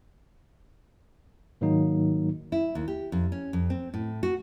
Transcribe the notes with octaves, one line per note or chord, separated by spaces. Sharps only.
G#2 D#3 F#3 A#3 D#4
E4
D#2
G4
F2
C#4
F2
C4
A2
F#4